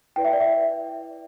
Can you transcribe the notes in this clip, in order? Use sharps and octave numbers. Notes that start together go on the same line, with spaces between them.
E4 B4 D5 G5
E5
D5
E5